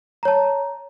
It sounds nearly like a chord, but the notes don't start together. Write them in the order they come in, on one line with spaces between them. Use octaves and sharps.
A#5 C#5 A5